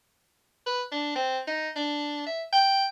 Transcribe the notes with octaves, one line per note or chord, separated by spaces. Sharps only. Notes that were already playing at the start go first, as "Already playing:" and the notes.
B4
D4
C4
D#4
D4
E5
G5